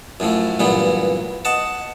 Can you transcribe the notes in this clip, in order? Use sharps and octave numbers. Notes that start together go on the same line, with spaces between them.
F#2 A2 F3 A3
G2 A#2 E3 F#3 B3
D#5 F#5 A5